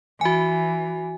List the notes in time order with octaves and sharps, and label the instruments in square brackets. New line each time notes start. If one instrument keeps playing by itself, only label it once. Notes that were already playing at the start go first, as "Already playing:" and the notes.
[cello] E3 [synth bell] F#4 G#5